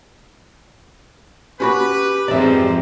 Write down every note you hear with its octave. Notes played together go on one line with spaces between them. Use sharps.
C#4 F#4 G4 B4 B5
F2 G#2 F3 C4 F4 D5 E5 A#5